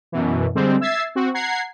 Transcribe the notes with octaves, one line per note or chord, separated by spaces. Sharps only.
F#2 B2 E3
D3 G3 G#3 C4
E5 E6 G#6 A6 C7
C4 F#4
F#5 A#5 G#6 C7